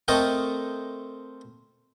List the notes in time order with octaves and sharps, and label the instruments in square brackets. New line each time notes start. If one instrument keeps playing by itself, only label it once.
[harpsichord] A3 C4 A4 A#4 D#5 G5